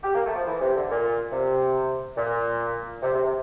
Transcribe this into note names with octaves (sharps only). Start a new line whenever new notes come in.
G4
A#3
A3
F3
E3
C3
D3
A#2
C3
A#2
C3
C3
C3